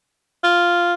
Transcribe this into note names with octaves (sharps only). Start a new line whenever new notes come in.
F4